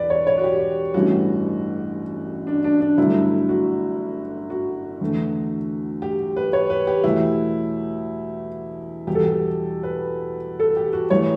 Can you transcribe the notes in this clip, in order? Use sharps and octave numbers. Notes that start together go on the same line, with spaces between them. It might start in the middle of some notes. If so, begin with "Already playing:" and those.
Already playing: E1 E3 G4 B4 D5
C#5
C#5
F#4
G4
A1 G2 E3 A3 F#4
D4
D4
D4
G1 G2 F#3 A3 E4
F#4
F#4
E2 D3 A3
G4
B4
C#5
B4
G4
E2 B2 A3 E4
E2 B2 G3 G4
A4
G4
B4
A4
G4
F#4
E3 A3 C#5